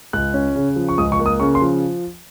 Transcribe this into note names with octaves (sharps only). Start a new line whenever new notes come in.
C#2 F#6
C#4
C#3
F3
C#6
C#2 D#6
C#6
A#3
D#6
C#3 C#6
C6
F3